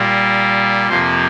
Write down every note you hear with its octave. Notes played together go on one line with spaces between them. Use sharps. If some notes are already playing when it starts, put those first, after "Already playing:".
Already playing: A#2 G3 A#3
F2 C3 F3 A#3 C5